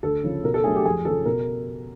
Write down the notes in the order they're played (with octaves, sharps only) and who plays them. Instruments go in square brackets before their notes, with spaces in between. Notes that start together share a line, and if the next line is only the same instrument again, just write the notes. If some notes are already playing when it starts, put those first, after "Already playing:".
[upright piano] D2 A4
C#3 F3
B2 A#4
A4
F#3 A3 D4 G#4
G4
F2 G#4
C#3 A4
F3
B2 A#4